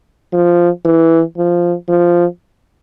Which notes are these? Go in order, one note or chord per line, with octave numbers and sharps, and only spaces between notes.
F3
E3
F3
F3